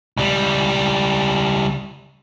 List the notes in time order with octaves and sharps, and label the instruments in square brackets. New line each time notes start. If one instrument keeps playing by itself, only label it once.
[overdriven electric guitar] C#2 G3